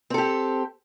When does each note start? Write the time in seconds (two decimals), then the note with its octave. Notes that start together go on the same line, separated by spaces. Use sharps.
0.10 C4
0.14 A4
0.18 G4